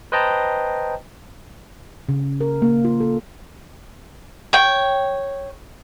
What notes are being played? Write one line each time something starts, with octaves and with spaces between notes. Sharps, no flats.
B4 C5 D#5 G5 A5 A#5
C#3
A#4
A#3
F4
A4
C#5 G5